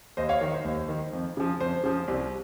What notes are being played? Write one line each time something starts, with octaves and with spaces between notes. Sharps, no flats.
D#2 C5 D#5
C#5 F5
D#3
C5
D#2
D#3
F2
C#3 F3
F2 C5
C#3 F3
C2